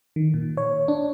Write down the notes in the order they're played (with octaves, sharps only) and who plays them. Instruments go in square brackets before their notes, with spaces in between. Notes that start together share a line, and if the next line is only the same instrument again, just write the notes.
[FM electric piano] D#3
A#2
C#5
D4